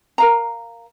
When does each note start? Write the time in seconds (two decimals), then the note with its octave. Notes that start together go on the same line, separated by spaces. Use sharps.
0.18 A#4 F5 A#5